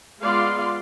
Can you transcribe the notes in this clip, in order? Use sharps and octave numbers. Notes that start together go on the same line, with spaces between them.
G#3 B3 F4 D5 F5 C6